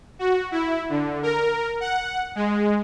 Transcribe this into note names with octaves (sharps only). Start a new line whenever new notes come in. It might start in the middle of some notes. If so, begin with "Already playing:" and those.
F#4
E4
D3
A#4
F#5
G#3